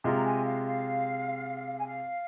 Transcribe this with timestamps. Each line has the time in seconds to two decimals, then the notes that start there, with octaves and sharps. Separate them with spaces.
0.04 C3 G#3 F4 A#5
0.24 G#5
0.44 F5
0.64 F5
1.78 G#5
1.86 F5